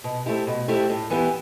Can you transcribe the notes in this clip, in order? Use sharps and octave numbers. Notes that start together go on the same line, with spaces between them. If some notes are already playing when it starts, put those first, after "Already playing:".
B2
A3 C4 E4 G4
B2
A3 C4 E4 G4
A2
E3 B3 E4 G4